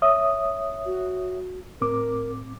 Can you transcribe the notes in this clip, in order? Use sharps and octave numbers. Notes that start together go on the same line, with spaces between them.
C#5 E5 D#6
F#4
A2 C4 A#4 D6